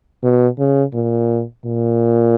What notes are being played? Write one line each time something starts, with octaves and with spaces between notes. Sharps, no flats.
B2
C#3
A#2
A#2